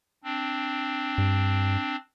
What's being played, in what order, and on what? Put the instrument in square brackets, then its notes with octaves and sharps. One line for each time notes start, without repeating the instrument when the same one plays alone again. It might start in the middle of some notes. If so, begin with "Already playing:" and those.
[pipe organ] C4 D4
[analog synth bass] G2